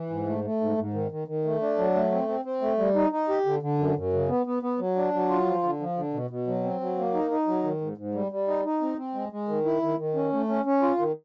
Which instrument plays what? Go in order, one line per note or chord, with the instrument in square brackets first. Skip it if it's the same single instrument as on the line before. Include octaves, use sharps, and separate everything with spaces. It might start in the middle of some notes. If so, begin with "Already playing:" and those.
Already playing: [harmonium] E3
G#2
A3
A3
G#2
G#2
D#3
D#3
D#3
A3
D4
F#3
A3
C4
C4
C4
A3
G3
D#4
D#4
G4
D3
D3
F#2
F#2
C#3
B3
B3
B3
F#3
D4
F#3
F4
F3
D3
F3
D3
B2
B2
F#3
C4
F#3
A#3
D#4
D#4
F#3
D#3
G#2
G#2
G3
G3
D#4
D#4
C4
C4
G#3
G#3
D#3
E4
D#3
D#3
C#4
A3
C#4
C#4
F4
D#3